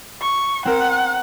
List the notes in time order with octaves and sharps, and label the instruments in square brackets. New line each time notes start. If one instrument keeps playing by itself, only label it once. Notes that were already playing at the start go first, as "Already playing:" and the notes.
[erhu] C#6
[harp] C4 A#4 [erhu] F#5